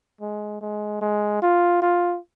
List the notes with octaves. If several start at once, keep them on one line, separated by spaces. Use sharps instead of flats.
G#3
G#3
G#3
F4
F4